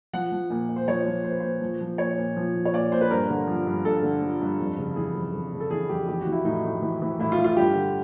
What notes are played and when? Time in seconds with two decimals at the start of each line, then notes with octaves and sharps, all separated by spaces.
0.13 F3 F#5
0.32 F3
0.50 A#2
0.69 A#2
0.76 C5
0.87 F3 C#5
1.06 F3
1.24 A#2 C5
1.31 B4
1.40 A#2 C5
1.61 F3
1.81 F3
1.98 A#2 C#5
2.18 A#2
2.36 F3
2.55 F3
2.65 C#5
2.73 A#2 D5
2.92 A#2 C5
3.01 B4
3.11 G2 A#4
3.30 D3
3.47 F3
3.66 G2
3.85 G2 A4
4.03 D3
4.22 F3
4.41 G2
4.60 F2
4.78 C#3
4.96 E3 G#4
5.15 F2
5.33 F2
5.53 C#3
5.60 A4
5.70 E3 G#4
5.89 F2 G4
6.08 E3 G4
6.21 F#4
6.27 E3
6.32 E4
6.45 A2 D#4
6.65 A2
6.82 E3
7.02 E3
7.20 A2 E4
7.32 F4
7.38 A2
7.44 F4
7.57 G2 G4
7.75 D3